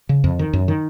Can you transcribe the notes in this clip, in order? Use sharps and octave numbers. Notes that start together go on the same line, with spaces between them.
C#3
F2
D#3
F#2
D#3